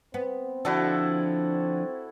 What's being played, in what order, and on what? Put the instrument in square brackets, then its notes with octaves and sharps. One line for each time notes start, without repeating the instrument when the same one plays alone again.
[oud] B3 [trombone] C4
[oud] D3 F3 D4 [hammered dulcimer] E4 F#4 A4